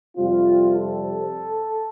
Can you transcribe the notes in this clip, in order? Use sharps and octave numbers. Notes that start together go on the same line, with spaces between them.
F2 C3 G3 C4 F4
A4